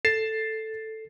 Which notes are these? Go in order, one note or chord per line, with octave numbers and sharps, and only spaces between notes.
A4 A6 C7 E7